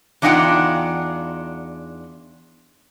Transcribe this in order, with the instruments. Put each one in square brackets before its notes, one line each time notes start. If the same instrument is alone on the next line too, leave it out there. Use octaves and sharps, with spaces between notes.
[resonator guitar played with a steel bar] E2 D4 D#4 F4 F#5 G5